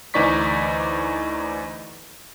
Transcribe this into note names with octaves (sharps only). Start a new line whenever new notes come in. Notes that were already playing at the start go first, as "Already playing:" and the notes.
D2 E3 D#4 D5 C#6 B6